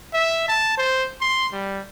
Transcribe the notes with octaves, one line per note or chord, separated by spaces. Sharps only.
E5
A5
C5
C6
G3